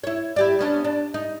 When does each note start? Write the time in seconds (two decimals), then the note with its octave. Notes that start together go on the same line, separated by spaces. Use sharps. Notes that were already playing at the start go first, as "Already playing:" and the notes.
0.04 E4 C#5
0.36 E4 G4 D5
0.59 B3 C#4 D4
0.84 D4
1.14 D#4